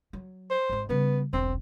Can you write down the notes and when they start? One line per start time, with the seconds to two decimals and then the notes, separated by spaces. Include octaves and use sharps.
0.13 F#3
0.50 C5
0.69 G#1 G#2
0.89 C#3 G3 B3
1.33 E1 B1 C4